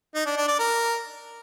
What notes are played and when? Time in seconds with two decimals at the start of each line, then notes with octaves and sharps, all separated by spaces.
0.15 D#4
0.26 D4
0.37 D4
0.48 D5
0.59 A#4